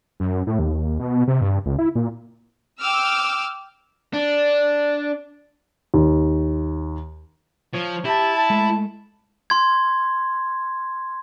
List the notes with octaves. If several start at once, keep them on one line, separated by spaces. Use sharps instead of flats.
F#2
A2
D#2
B2
C3
G2
C#2
E4
A#2
G5 D6 E6 F6
D4
D#2
F3 C#5
E4 G4 A5
G#3 A3
C6 G#6